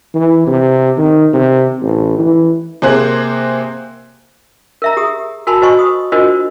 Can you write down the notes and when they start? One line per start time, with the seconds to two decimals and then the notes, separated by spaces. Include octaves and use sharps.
0.14 E3
0.47 C3
0.97 D#3
1.33 C3
1.82 A1
2.19 E3
2.82 C3 A#3 G#4 C5 F#6
4.82 A#4 E5 A#5
4.97 G4 G#4 D#6
5.47 F#4 A#4 G#5 A5 B5 C6
5.62 F#4 C5 D#5 G#5 C6 C#6
5.79 D#6
6.12 D4 F4 F#4 A#4 C5 D#5